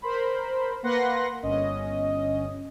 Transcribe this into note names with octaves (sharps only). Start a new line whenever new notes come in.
A#4 C5 B5
A#3 B4 F#5 C6 A#6
G1 C#4 D#5